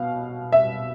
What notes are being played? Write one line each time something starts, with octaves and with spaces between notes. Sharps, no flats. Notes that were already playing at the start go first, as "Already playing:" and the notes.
Already playing: B2 F5
E5